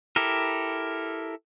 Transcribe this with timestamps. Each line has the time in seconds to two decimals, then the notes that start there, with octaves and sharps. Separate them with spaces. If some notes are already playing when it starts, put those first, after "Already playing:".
0.16 E4 G4 A4 A#4